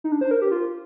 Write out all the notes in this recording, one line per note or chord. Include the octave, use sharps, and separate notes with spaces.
D#4
D4
C5
A#4
G4
F4